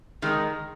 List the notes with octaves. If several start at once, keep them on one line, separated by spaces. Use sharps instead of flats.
D#3 G#3 D#4